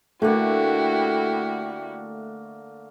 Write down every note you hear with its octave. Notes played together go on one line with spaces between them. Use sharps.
D3 A3 A#3 E4 F#4 G4